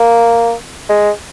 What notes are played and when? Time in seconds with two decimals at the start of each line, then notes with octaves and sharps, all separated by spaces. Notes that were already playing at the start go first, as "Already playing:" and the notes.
Already playing: A#3
0.89 G#3